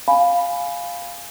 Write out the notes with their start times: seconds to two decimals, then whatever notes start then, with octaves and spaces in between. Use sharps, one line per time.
0.08 F5 G#5 B5